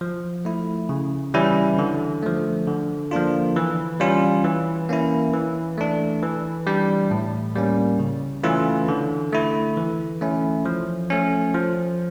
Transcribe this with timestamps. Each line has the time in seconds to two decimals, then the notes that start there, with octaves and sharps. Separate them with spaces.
0.01 F3
0.45 A3 E4
0.89 C#3
1.34 E3 G3 C#4 E4
1.79 D3
2.23 F3 A3
2.67 D3
3.11 F3 A#3 D4 F4
3.56 E3
4.00 G3 C#4 F4
4.44 E3
4.89 A#3 C#4 E4
5.33 E3
5.78 A3 D4
6.22 E3
6.67 G3 D4
7.11 A2
7.55 G3 A#3 C#4
7.99 C#3
8.43 E3 A3 C#4 F4
8.88 D3
9.32 A3 E4
9.77 E3
10.21 A3 C#4 E4
10.65 F3
11.10 A3 C#4
11.54 F3